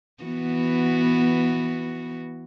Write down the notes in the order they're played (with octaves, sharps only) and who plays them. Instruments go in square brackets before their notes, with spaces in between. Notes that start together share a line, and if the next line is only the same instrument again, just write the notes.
[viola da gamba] E3 B3 F#4